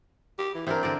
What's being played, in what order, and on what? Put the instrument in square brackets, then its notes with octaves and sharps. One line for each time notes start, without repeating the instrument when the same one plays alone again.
[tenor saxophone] G4
E3
[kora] E3 D4 A#4 [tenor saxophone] C4
[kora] D3 A#4 D5